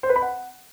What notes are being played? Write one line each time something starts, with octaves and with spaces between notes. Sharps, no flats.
C5
B4
B5
F#5